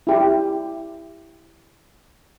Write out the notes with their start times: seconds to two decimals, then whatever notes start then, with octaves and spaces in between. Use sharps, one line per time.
0.07 E4 G4